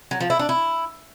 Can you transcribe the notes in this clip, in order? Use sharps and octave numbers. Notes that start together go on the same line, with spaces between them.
F#3
F3
E4
D4
E4